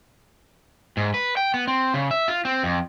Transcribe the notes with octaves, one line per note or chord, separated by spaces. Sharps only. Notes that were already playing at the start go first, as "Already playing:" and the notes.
G#2
B4
G5
B3
C4
C#3
E5
F4
C4
F2